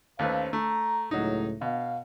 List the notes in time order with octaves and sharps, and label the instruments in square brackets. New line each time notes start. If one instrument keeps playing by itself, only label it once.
[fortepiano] D#2 A3 B4 [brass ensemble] C#4 C5 F5
[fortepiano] A3 [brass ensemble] A#5
[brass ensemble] C#2 A2 [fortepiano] F#3 D#4
[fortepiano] B2 [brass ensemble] F5